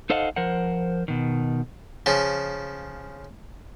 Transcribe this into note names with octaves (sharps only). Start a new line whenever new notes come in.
D#4 A4 C5 D#5 F5 F#5
F3 A#4 C5 F#5
B2 D#3
C#3 F3